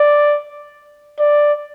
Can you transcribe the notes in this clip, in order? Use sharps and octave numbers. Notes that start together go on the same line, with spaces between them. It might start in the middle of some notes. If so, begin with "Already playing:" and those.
Already playing: D5
D5